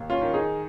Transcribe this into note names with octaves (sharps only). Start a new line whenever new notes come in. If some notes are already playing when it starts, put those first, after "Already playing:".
Already playing: D#2
C#4 F4
D#3
D#4 G#4